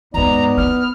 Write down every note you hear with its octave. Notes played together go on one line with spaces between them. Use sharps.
D#2 G#2 B3 D#4 D5 A#5
E4 F6